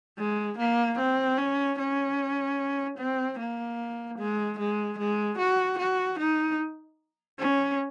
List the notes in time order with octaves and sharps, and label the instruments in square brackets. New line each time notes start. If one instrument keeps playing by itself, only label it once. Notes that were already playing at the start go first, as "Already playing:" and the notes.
[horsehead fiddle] G#3
A#3
C4
C#4
C#4
C4
A#3
G#3
G#3
G#3
F#4
F#4
D#4
C#4